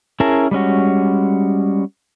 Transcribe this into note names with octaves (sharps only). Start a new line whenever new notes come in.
C#4 E4 G#4 A#4 A5
G3 G#3 C#4 F#4